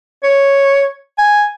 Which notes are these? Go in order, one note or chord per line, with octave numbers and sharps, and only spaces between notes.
C#5
G#5